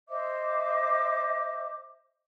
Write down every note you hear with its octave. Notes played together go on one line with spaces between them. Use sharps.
C5 D#5 E5 D6